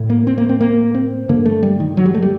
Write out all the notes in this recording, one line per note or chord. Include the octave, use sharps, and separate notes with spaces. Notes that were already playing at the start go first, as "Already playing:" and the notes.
Already playing: A2
A#3
C4
A#3
C4
A#3
C4
G2 D3 A#3
A3
G3
D#3
F#3
G3
A3
G3